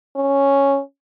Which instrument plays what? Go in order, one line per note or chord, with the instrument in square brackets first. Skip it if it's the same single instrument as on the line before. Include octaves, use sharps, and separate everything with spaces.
[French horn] C#4